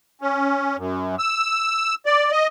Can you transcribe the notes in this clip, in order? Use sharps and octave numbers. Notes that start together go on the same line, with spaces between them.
C#4
F#2
E6
D5
D#5